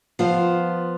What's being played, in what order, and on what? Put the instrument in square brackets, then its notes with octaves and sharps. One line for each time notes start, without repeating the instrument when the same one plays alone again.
[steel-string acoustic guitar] F3 B3 F4 C5